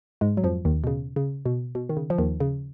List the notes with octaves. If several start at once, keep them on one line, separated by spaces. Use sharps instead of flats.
G#2 G#3
F#3
F2 F3
D#2 D#3
B2
C#3
C#3
B2
B2
D#3
C#3
F3
D#2 D#3
C#3